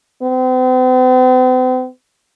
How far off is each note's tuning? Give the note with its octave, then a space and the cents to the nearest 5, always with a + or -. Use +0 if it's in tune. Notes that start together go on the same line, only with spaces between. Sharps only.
C4 -45